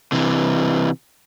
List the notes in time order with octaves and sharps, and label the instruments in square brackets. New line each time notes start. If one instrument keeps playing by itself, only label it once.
[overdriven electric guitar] C3 E3